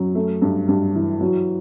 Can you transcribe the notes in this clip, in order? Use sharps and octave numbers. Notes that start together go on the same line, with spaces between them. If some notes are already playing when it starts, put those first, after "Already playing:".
Already playing: F#2 F#3
A3
G2
G2
E3
F#3